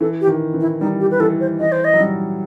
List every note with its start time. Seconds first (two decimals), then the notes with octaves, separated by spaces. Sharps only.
0.01 E3 A4
0.21 G4
0.27 D#3
0.54 E3
0.60 E4
0.81 G3 D#4
1.00 G4
1.11 B4
1.20 E3 A4
1.40 C5
1.60 E3 D#5
1.72 C5
1.84 D#5
1.94 F#3
2.00 G3